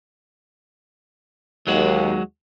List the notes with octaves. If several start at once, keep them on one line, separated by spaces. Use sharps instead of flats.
D#2 F#3 G#3 F#4